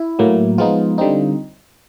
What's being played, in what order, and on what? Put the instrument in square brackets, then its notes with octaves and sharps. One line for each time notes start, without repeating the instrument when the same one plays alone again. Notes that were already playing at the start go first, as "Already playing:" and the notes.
Already playing: [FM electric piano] E4
A2 F#3 A#3
F3 G#3 B3 D#4 F4
D3 G3 C4 D#4